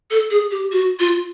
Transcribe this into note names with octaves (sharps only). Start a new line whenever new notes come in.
A4
G#4
G4
F#4
F4